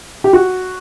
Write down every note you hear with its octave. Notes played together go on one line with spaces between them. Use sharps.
G4
F#4